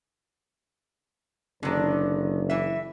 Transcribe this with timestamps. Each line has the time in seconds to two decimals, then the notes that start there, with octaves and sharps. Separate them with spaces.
1.63 F#1 D3 D#3
2.50 E3 E5